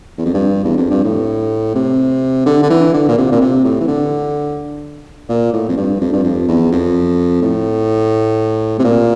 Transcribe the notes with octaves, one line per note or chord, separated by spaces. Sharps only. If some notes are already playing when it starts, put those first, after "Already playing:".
E2
F2
G2
E2
F2
G2
A2
C3
D3
D3
E3
D3
A#2
C3
A#2
C3
A2
E3
D3
A#2
A2
F2
G2
F2
G2
F2
E2
F2
A2
C3
A#2